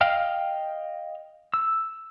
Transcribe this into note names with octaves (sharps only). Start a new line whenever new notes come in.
D#5 F5 G5 F6
E6